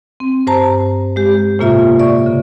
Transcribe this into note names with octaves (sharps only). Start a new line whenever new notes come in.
C4
G2 C5 A5 A#5
G#3 G4
A2 C3 A#3 F4 E5 A#5
D5 E5 C#6
C#3